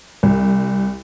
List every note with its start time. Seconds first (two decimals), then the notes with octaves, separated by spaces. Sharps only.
0.23 C2